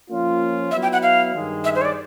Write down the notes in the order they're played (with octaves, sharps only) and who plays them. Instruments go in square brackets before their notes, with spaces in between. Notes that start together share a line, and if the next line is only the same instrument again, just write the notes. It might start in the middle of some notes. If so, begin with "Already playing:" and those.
[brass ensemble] F3 A#3 C#4 F4
[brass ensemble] F#3 B3 E4 [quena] E5
[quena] G5
F#5
F5
[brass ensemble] G2 D#3 G#3
[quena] E5
C5
C#5
D5